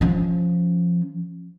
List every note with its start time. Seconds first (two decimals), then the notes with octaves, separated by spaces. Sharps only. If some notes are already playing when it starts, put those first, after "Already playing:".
0.01 F3 C#4